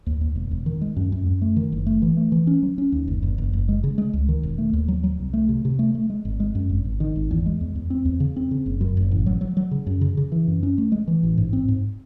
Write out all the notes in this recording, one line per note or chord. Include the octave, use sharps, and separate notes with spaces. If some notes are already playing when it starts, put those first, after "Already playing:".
D#2
D#2
E1
E1
D#3
G#3
F#2
F#2
F#2
A3
D#3
F#1
A3
E3
A3
E3
C#4
F#3
C#4
D#2
F#1
F#1
F#1
F#1
G#3
C#3
G#3
C#2
D#3
E1
A3
D#2
F#3
F#3
C2
A3
C3
C3
A3
A3
G#3
G#1
G#3
F#2
G#1
G#1
D#3
G#1
E2
G#3
E2
E2
C4
E2
C#3
C4
C#3
F#1
F#2
F#1
A1
F#3
F#3
F#3
C#3
F#2
C#3
C#3
E3
F#2
C#4
A3
G#3
E3
A1
G#2
C4
G#2